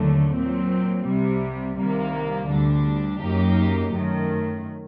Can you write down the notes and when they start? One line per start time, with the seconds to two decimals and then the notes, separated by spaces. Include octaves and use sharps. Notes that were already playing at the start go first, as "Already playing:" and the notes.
Already playing: D#2 D3 F#3 A3
0.35 A#2 F#3 C4
1.06 C2 C3 G3
1.78 C2 C3 D#3 G3 A#3
2.49 D2 D3 G3 D4
3.20 F#2 F#3 A#3 D#4 G4
3.93 F#2 D#3 A3